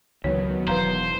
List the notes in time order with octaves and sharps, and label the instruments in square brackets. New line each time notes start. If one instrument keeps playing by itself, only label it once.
[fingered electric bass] C#2 E3 [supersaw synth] D#3 F#3 B3 [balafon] C#5
[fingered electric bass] E1 E3 [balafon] B4 F5 A#5 [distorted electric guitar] C5